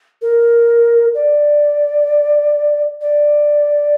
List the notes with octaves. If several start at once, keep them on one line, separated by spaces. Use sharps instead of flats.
A#4
D5
D5